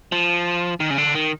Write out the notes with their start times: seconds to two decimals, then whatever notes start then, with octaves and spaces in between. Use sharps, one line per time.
0.12 F3
0.80 D#3
0.90 C#3
0.98 D3
1.15 D#3